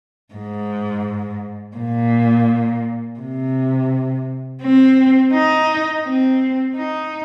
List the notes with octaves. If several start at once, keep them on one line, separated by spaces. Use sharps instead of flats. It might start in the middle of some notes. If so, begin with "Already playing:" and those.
G#2
A#2
C3
C4
D#4
C4
D#4